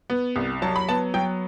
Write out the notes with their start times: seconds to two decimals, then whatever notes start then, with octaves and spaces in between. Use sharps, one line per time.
0.10 B3
0.36 C2
0.62 F#3 A5
0.76 B5
0.89 B3 A5
1.14 F#3 G5